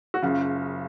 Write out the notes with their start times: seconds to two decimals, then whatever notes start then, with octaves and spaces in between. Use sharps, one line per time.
0.14 F#4
0.22 F#1 F#2 C#3 F4